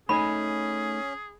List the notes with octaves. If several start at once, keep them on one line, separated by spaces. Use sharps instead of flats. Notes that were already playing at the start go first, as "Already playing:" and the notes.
A3 C#4 D#4 G#4 G#5 B5